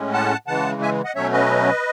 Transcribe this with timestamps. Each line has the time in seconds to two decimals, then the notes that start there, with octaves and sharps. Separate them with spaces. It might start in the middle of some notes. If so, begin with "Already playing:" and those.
Already playing: A2 G#3 C#4
0.13 F#5 A5
0.47 C#3 E3 G#3 F#5 A5
0.82 E5 G#5
1.04 D#5 F#5
1.15 B2 F#3 A3 C#4 C#5 E5
1.32 B4 D#5